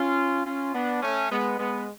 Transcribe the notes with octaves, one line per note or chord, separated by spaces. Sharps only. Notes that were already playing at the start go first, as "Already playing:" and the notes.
Already playing: C#4 F4
C#4 F4
B3 D4
A3 C#4
G#3 B3
G#3 B3